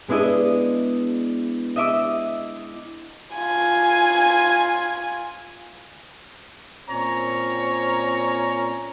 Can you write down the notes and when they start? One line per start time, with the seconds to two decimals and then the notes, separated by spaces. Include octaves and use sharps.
0.08 G#3 B3 D4 E4 D#5
1.76 D#5 E5 D6 E6
3.36 F4 G#5
6.89 A#2 C4 C#4 C#5 A#5